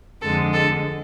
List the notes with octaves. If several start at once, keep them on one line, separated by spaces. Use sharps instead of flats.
F2 D3 G#3 A4
A4